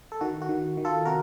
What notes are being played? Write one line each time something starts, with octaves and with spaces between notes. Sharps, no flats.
A4
D#3 F#4
F#4
D#3
D#3
F4 A4
C3 F#4 A#4